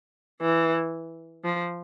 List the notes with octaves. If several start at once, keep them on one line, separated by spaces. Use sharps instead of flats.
E3
F3